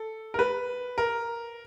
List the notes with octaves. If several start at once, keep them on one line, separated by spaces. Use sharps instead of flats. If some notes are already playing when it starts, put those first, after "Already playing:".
Already playing: A4
A#4
B4
A#4